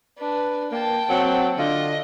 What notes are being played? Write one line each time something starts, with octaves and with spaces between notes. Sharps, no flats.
D4 B4
A#3 G5 A5
F#3 C4
D3 F4 D#5